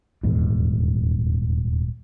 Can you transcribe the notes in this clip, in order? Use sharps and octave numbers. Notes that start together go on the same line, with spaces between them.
D#1 E2 G#2